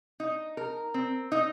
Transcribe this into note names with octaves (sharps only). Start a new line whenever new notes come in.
D#4
A#4
C4
D#4